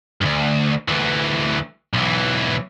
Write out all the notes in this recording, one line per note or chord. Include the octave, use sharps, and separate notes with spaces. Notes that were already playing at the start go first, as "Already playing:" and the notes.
D2 G2
D2 E3
B1 E3